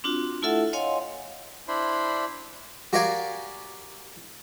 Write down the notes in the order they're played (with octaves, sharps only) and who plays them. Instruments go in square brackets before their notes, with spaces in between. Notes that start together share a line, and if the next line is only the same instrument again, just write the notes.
[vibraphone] C4 D4 F4 F#4
A3 E4 F4 A4 E5 F#5
C#5 D#5 F5 F#5 G#5 C6
[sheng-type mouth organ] D4 E4 C5 B5 C6
[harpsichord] F#4 G4 A#4 D5 F5 G#5